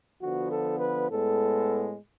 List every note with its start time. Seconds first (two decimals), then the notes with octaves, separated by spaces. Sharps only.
0.22 D3 F3 B3 F#4
0.51 A4
0.80 B4
1.09 A2 G#3 B3 A4